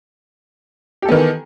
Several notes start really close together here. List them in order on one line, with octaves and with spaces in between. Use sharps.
G4 A4 B3 D#3 E3